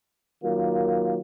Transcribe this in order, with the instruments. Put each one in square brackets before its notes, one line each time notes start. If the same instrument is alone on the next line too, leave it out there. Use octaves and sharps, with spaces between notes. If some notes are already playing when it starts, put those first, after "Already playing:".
[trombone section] D#3 F#3 A#3 F4